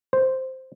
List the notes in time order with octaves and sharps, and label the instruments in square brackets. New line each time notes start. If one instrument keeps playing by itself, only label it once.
[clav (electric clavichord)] C5